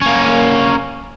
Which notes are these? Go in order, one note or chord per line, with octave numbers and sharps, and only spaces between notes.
A#3 C#4